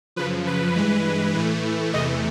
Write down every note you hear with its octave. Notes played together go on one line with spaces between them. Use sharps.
F#2 C#3 F3 B4
B4
G2 E3 G#3
A2 E3 A3
E2 C3 E3 A3 D#5